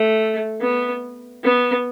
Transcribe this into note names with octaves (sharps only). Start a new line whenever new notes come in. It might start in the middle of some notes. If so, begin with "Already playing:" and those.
Already playing: A3
B3
B3